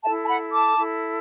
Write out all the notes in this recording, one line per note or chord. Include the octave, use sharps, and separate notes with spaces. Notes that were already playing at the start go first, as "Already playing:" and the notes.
E4 A4 E5 A5
A5
F#5 B5
A5 D6
E4 A4